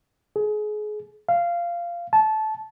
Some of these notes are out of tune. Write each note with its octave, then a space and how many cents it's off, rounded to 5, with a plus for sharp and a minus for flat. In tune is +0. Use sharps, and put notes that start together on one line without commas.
G#4 +30
F5 -15
A5 -20